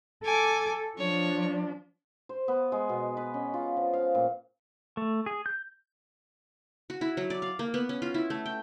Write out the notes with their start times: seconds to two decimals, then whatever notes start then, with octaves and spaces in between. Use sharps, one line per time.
0.24 A4 G#5 D6
0.98 F3 D4 C#5
2.29 C5
2.48 B3
2.72 G#3
2.89 B2
3.17 B4
3.34 C#4
3.54 F4
3.77 F3
3.93 F5
4.15 A#2
4.97 A3
5.26 G#4
5.46 G6
6.90 F#4
7.01 E4
7.17 F#3
7.30 D5
7.42 F5
7.59 A#3
7.74 B3
7.89 C#4
8.02 F4
8.14 E4
8.30 A3
8.46 G5